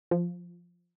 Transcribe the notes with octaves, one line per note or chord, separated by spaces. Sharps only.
F3